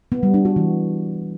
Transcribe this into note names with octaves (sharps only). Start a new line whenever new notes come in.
B3
G3
D4
F#4
E3